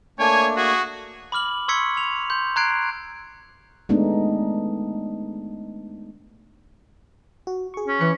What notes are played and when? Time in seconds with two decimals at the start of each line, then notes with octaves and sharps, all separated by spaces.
0.19 A3 A#3 D4 C#5 G#5
0.57 F#4 G#4
1.32 B5 D6 F6 F#7
1.68 C6 C#6 E6 G#6 B6 C#7
1.97 F7
2.30 C6 G6
2.56 A#5 C6 F#6 G#6 C7 D7
3.89 G#3 A3 B3 D4 D#4
7.47 F#4
7.74 G#4 C#6
7.88 C#4
8.01 E3 B5 F#6 C#7